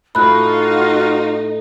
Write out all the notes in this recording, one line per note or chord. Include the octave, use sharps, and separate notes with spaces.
A2 D#4 F4 F#4 B5 F#6